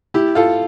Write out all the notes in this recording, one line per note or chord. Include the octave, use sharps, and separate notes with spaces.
E4 G4
F4 A4